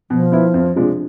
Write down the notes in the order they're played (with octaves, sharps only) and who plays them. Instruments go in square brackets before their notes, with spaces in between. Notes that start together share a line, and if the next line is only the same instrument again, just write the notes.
[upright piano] B2 [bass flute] F3
[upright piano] B3 E4
F2
C3 F3 G#3 D4